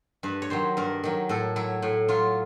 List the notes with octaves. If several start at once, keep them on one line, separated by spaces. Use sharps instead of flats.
G2 B4
C#5
D#3 F#3 C5
G2 A#4
D#3 F#3
A2 A4
F#3 E4
A2
F#3 F4